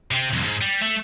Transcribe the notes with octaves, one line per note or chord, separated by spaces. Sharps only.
C3 C4
C2 F2
G#2
G3
A3